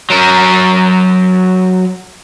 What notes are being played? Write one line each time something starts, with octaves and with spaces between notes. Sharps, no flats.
F#3 A#4